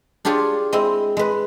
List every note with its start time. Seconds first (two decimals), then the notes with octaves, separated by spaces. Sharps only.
0.25 D4 F4 G4 G#4 C#5
0.73 G#3 C4 E4
1.17 G#3 B4